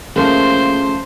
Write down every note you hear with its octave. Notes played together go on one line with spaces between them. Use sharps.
C#3 F3 A3 A#3 C5